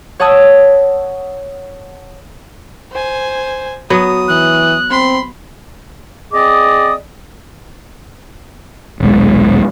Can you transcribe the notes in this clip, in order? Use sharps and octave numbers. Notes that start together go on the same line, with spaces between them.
C#5 F#5 A5 D#6 E6 G#6
C5 G#5
F#3 B3 D#6
E3 F#6
C4 B5 C6
C4 G#4 D5 D#5 D6 D#6
D#1 B1 G#3